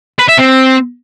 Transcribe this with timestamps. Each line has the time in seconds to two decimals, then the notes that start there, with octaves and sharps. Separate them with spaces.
0.19 B4
0.28 E5
0.38 C4